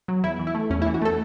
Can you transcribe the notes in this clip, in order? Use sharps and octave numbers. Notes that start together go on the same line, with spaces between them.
F#3
E2 E4
E3
E4
A3
E2 C#4
E4
E3
F#4
A3 A4